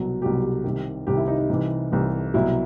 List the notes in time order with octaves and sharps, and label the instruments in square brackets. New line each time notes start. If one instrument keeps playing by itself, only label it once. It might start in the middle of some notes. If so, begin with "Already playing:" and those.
Already playing: [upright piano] C2 B2 F#3
C2 B2 F#3 G4
C2 C3 D#3
C2 C3 D#3 G4
E4
D#4
D#4
C2 C3 E3
C2 C3 E3
C2 B2 F#3 E4